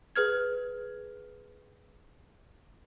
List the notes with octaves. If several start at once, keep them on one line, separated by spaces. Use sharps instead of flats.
G#4 B4 F6 G#6